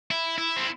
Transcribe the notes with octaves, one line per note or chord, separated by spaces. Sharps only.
E4
E4
C4